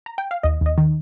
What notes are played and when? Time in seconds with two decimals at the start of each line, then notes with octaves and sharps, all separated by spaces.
0.06 A#5
0.18 G5
0.31 F5
0.43 D#2 D#5
0.61 D#2 D#5
0.78 D#3